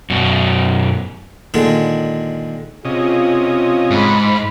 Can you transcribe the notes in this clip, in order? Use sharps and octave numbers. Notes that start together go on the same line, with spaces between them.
F#2 B2
A#2 D3 D#3 G#3
C3 C#4 F4 G#4 D#5
G#2 F5 B5